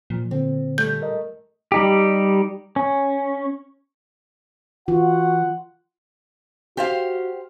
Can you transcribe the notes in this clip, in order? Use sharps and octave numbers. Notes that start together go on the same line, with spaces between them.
A#2 F3
D3 C4
G3 A3 G6
A#4 D#5
G3 D#4 G4
C#4
E3 F4 F#4 F#5
F#4 G4 C5 F5